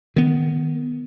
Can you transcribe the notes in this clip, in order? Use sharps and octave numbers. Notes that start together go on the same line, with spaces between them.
D#3 B3